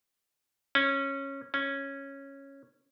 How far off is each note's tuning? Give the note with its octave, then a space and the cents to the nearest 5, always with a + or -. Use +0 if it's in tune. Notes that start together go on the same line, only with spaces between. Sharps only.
C#4 -15
C#4 -10